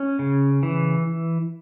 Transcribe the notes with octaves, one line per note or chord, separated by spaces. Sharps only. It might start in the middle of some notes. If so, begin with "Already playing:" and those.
Already playing: C#4
C#3
E3